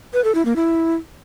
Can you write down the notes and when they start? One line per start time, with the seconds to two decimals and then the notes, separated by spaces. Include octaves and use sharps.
0.14 B4
0.24 A4
0.35 E4
0.45 A#3
0.56 E4